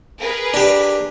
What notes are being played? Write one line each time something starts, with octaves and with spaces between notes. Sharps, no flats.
G#4 A#4 B4
D4 G4